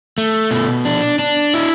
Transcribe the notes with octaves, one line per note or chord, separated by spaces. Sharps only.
A3
B2
D4
D4
E4